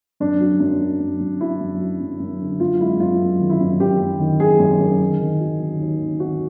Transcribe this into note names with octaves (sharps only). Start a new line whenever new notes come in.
F#2 D4
F#3
F#2
F#3
F#2
F#2
F#3 E4
F#2
F#3
F#2
F#2
D3
F#2 F4
G#3 E4
F#2 F4
F#2
D#3
E4
F#2
F#2 G4
F#2
D#3
F#2 G#4
F#2
F#2
D#3
D#3
F#3
D#3
D#2
D#2
D#3 F#4